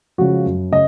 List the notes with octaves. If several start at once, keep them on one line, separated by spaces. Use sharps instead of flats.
C#3 F3 G#3 F#4
F#2
C#3 D#5